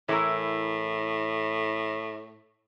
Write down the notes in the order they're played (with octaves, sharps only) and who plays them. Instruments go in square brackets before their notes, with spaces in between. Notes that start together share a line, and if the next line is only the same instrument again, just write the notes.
[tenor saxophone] A2 [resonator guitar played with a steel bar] E3 E4 A#4